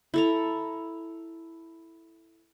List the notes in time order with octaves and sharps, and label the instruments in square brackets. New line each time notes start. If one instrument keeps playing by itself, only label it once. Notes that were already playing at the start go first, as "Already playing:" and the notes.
[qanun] E4 A4 A#5